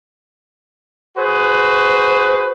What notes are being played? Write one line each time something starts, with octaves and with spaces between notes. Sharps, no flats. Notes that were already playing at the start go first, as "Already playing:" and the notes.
F#4 G#4 B4 C5